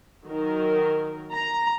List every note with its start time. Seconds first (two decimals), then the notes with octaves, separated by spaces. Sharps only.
0.25 D#3 F#3 A#4
1.33 A#5